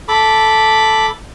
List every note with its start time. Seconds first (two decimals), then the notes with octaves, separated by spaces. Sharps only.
0.08 A4 B5 D6